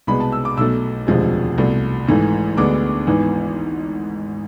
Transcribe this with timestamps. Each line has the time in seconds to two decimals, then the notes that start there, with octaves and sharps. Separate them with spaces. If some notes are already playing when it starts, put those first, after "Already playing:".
0.07 C2 B2 G#3 B3 B5
0.20 A5
0.32 E6
0.45 D6
0.57 B1 B2 A3 E6
1.07 E1 D2 C3 F3 G#3
1.58 C2 B2 A3
2.07 G#1 G#2 E3 A3
2.57 D2 D3 G#3 B3 D6
3.07 G#1 G#2 E3 B3